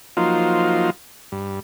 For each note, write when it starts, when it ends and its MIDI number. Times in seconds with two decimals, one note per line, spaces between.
0.17 0.90 53
0.17 0.90 54
0.17 0.90 58
0.17 0.90 63
0.17 0.90 65
0.17 0.90 72
1.32 1.60 43